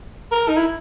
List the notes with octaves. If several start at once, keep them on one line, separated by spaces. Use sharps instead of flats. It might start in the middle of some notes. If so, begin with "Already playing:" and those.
A#4
D#4
E4